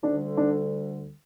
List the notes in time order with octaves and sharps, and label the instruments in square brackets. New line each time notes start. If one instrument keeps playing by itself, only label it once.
[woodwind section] D2 D3 G3 [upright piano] D4
[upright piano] D4